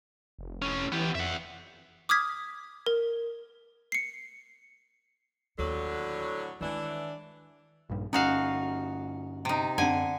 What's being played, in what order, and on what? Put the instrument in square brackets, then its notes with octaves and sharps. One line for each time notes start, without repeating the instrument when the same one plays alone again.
[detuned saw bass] F1
[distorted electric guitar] A2 C#4
[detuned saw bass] E3 [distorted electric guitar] B3 G4
[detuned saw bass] F2 [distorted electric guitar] E5 F#5
[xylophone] D6 D#6 F6 G#6 B6
A#4
C7 C#7
[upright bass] D#2 [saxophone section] A2 D3 F#3
[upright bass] D#3 G#3 [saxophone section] E3 D4
[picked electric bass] A#1 G2
[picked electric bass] G1 C#4 [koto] D#4 F#4 F5
[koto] C3 D#4
[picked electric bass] F#2 C4 [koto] D3 G#5